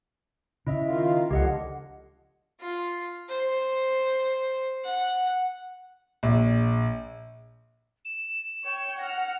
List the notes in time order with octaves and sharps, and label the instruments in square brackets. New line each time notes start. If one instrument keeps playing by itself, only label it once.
[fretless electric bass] C#3 [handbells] E4 D#5 E5
[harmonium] D#3 F4
[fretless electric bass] C#2 [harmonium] D3 F3 [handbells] G4 D#5 F#5
[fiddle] F4
C5
F#5
[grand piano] A#1
[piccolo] E7
[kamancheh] C#5 G5
[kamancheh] F#5 F6 [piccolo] A#6